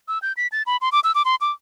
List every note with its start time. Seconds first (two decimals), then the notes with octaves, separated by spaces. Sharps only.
0.08 E6
0.22 G6
0.37 B6
0.52 A6
0.66 B5
0.81 C6
0.92 D6
1.04 E6
1.15 D6
1.25 C6
1.41 D6